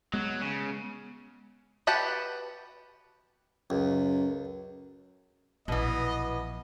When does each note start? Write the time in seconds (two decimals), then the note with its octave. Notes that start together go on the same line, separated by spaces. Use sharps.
0.14 F#3 G#3 B3
0.41 C#3
1.87 F#4 G4 B4 F#5 A5
3.70 C#2 F#2
5.68 A#1 B2 E3 B3 D#5